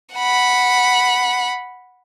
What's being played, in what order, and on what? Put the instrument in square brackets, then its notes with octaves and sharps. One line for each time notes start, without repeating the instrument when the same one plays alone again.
[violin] F#5 B5